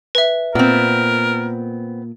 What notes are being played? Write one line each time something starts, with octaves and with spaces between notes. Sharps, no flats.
B4 E5
A#2 B3 C4 A#4